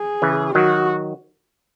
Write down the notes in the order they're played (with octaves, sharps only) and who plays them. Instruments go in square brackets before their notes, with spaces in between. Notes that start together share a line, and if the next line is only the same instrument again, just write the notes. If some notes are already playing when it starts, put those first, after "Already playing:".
Already playing: [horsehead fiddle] G#4
[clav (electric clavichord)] C#3 E3
[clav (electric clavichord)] D#3 F#3 [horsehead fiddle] F#4